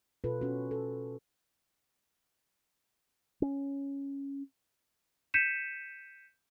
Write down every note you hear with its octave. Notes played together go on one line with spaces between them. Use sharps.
B2 F4 A4 B4
C#4 F#4
A4
C#4
G6 B6 C#7 D#7 E7